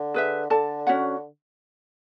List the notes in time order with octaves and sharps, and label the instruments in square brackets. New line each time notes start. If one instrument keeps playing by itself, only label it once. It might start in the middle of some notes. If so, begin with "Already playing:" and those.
Already playing: [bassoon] D3
[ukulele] G#4 B4 E5
[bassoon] D3 [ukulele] A4 D5 A5
[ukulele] C#4 F#4 C#5 F#5